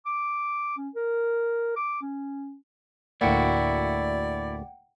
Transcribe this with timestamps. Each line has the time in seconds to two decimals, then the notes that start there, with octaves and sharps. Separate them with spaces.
0.06 D6
0.77 C#4
0.95 A#4
1.76 D6
2.02 C#4
3.21 D2 A2 A#3 E4 F#4 D5 F#5 G5